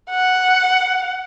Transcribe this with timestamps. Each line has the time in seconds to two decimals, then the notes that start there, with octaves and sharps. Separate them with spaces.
0.10 F#5